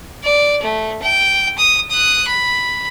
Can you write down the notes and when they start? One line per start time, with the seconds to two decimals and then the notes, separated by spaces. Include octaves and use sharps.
0.24 D5
0.63 A3
1.03 G5
1.58 D#6
1.91 D#6 F#6
2.27 B5